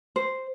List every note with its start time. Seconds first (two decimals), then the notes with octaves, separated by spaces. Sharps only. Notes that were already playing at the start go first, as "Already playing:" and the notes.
0.16 C5